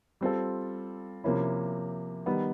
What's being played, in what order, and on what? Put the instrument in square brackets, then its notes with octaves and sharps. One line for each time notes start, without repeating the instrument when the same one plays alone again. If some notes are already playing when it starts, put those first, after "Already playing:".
[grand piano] G3 C4 F4 A4
C3 F3 A#3 C#4 E4
D#3 G3 B3